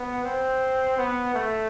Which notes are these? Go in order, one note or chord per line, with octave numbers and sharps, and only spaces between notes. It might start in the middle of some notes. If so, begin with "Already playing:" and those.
Already playing: B3
C4
B3
A3